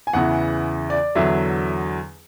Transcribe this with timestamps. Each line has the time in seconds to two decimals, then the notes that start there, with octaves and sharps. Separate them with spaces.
0.07 G#5
0.13 E2 C#3 E3 F#5
0.90 D5
1.15 E2 D3 F#3 E5